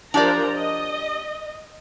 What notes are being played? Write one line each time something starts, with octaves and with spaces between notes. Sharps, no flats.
F3 D4 G4 A#4 D5 A#5
D#5